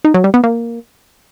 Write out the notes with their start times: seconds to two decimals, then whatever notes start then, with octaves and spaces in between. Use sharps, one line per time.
0.05 D#4
0.14 F#3
0.24 G3
0.34 B3
0.44 A#3